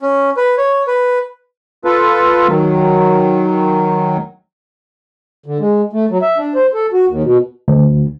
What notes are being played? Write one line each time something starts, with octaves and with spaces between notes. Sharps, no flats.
C#4
B4
C#5
B4
F4 A4 B4
D#3 F#3
D3
G#3
A3
F#3
E5
D4
C5
A4
F#4
D#2
B2
D2